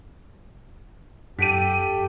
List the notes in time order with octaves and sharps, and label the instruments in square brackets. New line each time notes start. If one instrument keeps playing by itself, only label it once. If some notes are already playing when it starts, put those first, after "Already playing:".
[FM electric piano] F#2 [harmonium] G4 A4 [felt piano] B6 D7 D#7